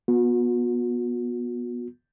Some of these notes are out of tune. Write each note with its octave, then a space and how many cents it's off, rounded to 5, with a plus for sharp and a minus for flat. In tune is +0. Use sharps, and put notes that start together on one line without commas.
B3 -20 F#4 -40